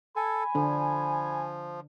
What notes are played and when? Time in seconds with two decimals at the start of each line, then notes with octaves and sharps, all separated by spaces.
0.16 A4 G#5 B5
0.55 D3 F3 D4